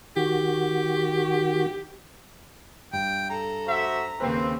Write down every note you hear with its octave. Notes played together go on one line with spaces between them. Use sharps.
D#3 F#4 G4
G2 G5
A4 A#5
F#4 C5 E5
D#2 C#3 A#3 C4 B4